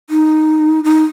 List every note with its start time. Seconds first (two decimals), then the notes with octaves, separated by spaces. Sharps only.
0.10 D#4
0.84 D#4